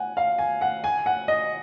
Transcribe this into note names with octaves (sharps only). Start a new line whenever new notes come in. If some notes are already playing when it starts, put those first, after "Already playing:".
Already playing: F#5 G#5
F5
G#5
F#5
G#5
F#5
D#5